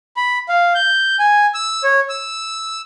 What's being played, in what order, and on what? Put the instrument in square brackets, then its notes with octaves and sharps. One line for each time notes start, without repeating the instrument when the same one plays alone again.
[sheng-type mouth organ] B5
F5
G6
G#5
E6
C#5
E6